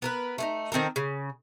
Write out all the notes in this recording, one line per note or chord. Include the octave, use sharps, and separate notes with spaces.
B3 A#4 B4
A3 B3 D#4
D#3 C4 A4 A#4
C#3